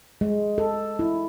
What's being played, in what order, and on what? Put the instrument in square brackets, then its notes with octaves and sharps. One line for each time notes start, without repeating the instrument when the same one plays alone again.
[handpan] G#3
A4
E4